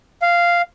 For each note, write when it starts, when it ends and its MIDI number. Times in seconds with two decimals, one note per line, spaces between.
0.22 0.62 77